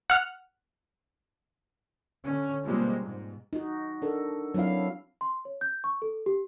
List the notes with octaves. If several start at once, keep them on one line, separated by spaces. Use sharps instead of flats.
F#5 F6
D3 C#4
B2 F3 G3 G#3 A#3 C4
G#2
D#4 F#4
D4 A4 A#4
F#3 C4 D4 E4 F5
C6
C#5
G6
C#6
A4
G4